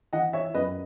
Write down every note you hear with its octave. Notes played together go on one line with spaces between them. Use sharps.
E3 D#5 F#5
C#5 E5
F#2 B4 D#5